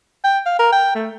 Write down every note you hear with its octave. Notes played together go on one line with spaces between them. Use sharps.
G5
F5
A#4
G5
A3